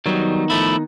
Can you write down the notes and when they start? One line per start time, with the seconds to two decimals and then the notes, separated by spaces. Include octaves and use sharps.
0.06 D#3 F#3 G3 B3 D#4
0.50 F3 A3 E4